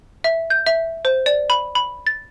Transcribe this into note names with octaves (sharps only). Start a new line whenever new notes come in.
E5
G6
E5
C5
D5
B5
B5
A6